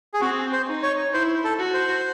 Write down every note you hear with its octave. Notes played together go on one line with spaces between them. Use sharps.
G#4
C4 F#4
C5
D#4
C#5
E4 C5
A4
F#4
C5